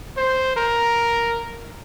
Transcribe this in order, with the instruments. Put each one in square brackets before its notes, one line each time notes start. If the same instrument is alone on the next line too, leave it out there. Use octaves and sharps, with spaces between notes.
[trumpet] C5
A#4